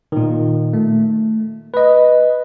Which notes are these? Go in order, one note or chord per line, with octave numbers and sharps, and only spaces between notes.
A#2 D#3
A3
B4 D#5